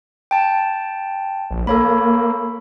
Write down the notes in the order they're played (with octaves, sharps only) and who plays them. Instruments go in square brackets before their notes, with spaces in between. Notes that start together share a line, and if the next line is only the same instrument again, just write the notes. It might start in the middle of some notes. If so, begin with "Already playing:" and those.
[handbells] G5 A5
[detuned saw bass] A#1
[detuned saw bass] A#3 [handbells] A4 C#5 B5